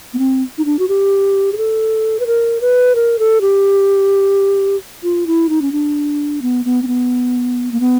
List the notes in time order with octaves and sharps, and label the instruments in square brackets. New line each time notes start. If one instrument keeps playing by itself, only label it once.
[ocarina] B3
C4
D#4
D4
F#4
G4
G#4
A4
B4
A#4
B4
A#4
A4
G4
F4
E4
D#4
C#4
D4
B3
B3
C4
B3
A#3
B3